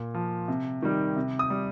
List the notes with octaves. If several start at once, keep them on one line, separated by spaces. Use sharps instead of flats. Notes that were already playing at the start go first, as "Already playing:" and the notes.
Already playing: A#2
F3
C3
D#3 G3
C3
D#6
G3